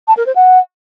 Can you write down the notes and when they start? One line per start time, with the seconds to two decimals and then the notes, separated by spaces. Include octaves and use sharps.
0.08 A5
0.17 A#4
0.26 C5
0.36 F#5